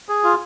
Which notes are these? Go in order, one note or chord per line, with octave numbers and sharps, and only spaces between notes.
G#4
F4